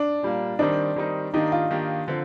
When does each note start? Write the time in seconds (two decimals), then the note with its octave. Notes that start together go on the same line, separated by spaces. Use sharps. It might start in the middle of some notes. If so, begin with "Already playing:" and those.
Already playing: D4
0.23 A#2 G3 A#3
0.59 D#3 G3 C4 D4 D#4
0.96 D#3 G3 C4 D#4
1.33 D#3 A#3 D4 D#4 G4
1.52 F4
1.71 D#3 A#3 D4 G4
2.08 D3 F3 C4